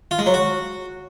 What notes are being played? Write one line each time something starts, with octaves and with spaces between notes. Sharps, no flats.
F4
G#3
F#3
F#4